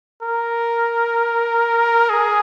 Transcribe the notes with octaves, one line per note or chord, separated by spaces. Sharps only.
A#4
G#4